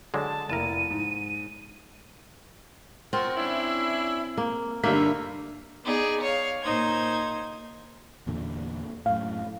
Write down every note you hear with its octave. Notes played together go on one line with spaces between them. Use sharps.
D3 F#3 G#3 A5
F1 A#3 E4 A#4 A5 D#7
G#2
C4 F4 F#4 A#4
C#4 D4 E4
A#3
G2 D3 A#3 D#4 F4 E5 B6
B3 D#4 G#4 D5
C#5 F5
A#2 D#4 C5 G#6
E2 A#2 D3
F#2 A2 F5